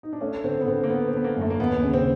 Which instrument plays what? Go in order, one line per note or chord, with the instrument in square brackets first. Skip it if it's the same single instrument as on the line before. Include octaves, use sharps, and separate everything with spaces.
[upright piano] D#4
D4
[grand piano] A3 [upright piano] C#4
[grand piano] D3 [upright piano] C4
[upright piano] B3
[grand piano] D3 [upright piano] C4
[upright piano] A#3
[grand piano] D3 [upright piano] B3
[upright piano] C4
[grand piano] D3 [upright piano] B3
[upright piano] A#3
[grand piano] F#2 [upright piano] A3
[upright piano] A#3
[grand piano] D#2 [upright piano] B3
[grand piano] C#3
[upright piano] C4